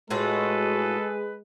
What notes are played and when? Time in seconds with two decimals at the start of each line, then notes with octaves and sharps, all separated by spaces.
0.10 A2 G#3 F4 F#4 G#4 A4 B4